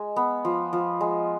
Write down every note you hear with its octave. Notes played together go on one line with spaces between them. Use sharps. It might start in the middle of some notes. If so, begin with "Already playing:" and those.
Already playing: G#3
B3
F3
F3
G#3